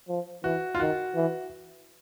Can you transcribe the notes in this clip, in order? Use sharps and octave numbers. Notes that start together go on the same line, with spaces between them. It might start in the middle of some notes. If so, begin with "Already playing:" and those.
F3
E3 F#4
F4
D#3 F#4
E3